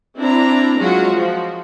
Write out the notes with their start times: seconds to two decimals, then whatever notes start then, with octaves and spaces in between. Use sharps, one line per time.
0.18 C4 D4 E4 A#5
0.80 F#3 G#3 F4 F#4
1.14 F3